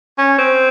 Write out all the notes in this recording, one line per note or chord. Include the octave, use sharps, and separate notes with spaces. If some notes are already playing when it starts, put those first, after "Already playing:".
C#4
C4